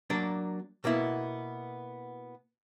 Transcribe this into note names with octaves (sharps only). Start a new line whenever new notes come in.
F#3 A#3 D4 A#4 D5
B2 A#3 B3 E4